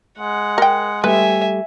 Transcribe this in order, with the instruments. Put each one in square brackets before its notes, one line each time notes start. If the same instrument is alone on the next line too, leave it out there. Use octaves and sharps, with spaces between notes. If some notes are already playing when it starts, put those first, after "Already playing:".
[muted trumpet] G#3 [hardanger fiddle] F#5
[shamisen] A#4 G5
[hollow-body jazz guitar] G3 A3 G4 [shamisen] B4 [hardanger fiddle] E5 G#5